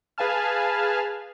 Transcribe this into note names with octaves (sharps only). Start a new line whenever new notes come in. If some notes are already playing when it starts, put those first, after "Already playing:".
G#4 B4 F5 G#5 A5 F6